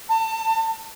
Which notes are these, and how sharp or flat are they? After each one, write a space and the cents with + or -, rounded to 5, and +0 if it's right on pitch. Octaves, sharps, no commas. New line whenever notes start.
A5 +30